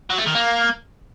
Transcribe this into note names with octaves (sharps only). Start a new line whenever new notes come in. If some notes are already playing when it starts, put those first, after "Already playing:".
F#3
A3
D#3
A#3